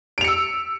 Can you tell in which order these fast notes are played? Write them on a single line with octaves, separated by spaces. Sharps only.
D7 F7 C#7 E6